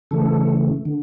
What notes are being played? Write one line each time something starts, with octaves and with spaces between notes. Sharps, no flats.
C#3 E3 A3 A4
D3